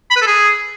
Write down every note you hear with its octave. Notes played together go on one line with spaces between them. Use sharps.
B5
B4
A4
G#4